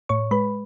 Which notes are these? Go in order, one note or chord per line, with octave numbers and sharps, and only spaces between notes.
A2 C#5 C#6
G#3 B4 B5